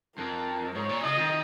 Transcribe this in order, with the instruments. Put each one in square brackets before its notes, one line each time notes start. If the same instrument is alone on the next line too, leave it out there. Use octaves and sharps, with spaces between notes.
[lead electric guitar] F2 [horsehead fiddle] A#4
[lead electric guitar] G#2 [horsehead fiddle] C#5
[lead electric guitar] A#2
[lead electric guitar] C#3 [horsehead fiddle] D#5
[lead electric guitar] D#3